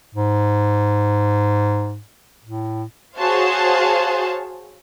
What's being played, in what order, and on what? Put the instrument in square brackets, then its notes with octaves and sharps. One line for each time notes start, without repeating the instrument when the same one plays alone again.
[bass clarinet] G#2
A2
[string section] F#4 G#4 C5 C#5 F5 A5